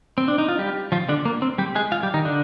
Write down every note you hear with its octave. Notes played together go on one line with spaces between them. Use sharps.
C4
D4
D#4
F4
G3 G4
F3 F4
D3 D4
A#3
C4
G3 G4
G#3 G#4
F4 F5
G3 G4
D#3 D#4
D3 D4